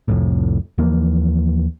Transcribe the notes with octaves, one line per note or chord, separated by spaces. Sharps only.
C2 F2 A2
D#2 E3 F3 A#3